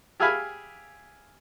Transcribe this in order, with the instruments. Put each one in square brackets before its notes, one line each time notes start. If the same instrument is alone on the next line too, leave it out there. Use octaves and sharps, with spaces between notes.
[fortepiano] G4 G#4 E5 F5 G#5 B5